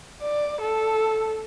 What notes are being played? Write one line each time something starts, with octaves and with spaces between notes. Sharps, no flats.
D5
A4